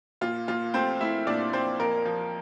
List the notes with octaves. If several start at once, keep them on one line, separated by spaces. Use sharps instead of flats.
A#2 F4
A#2 F4
A3 C4 C5
A3 E4 E5
A#2 D4 D5
A#2 C4 C5
F2 A#3 A#4
F3